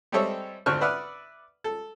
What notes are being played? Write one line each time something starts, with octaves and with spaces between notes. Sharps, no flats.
G3 G#3 C4 A4 C#5 E5
G#1 D2 C5 C#6 F6 F#6
B4 D5 E5 F#5 D#6 F6
A4